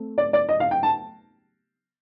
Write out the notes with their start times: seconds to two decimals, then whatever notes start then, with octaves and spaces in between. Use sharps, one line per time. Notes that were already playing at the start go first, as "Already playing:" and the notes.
Already playing: A3 C4
0.18 D5
0.33 D5
0.49 D#5
0.60 F5
0.71 G5
0.83 A5